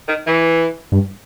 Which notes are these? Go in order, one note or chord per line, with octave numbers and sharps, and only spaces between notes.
D#3
E3
G2